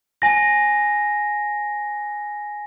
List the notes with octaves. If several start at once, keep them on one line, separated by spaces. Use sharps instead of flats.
G#5 A#6